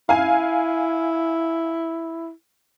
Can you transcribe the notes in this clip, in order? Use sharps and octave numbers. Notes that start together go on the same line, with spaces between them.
E4 F5 G#5